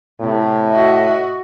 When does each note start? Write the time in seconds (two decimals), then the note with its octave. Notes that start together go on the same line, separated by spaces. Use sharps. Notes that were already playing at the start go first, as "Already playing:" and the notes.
0.20 A2 C3
0.69 F#4 D#5 E5